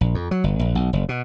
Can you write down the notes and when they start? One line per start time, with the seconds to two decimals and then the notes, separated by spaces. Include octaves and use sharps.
0.01 A#1
0.15 F2
0.31 F#3
0.44 G1
0.59 A#1
0.75 B1
0.93 F#1
1.09 B2